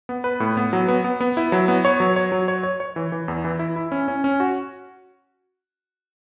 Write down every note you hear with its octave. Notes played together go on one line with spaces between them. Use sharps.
B3
B4
A2
B3
F#3
B3
B3
B3
E4
F#3
B3
C#5
F#3
C#5
F#3
C#5
C#5
C#5
E3
E3
E2
E3
E4
E4
C#4
C#4
C#4
F#4